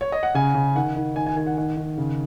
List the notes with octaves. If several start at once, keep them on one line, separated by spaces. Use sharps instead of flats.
C#5
D#5
F#5
C#3 G#5
C#3
D#3 F#5
D#3
D#3 G#5
G#5
D#3 G#5
F#5
D#3 F#5
D#3
C#3